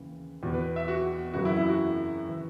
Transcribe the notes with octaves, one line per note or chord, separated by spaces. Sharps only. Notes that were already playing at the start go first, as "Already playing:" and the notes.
Already playing: D#2 C#3 E3
E2 B2
B4
E5
F#4
F#2 C#3 E3 F#4
E4
E4
F#4
E3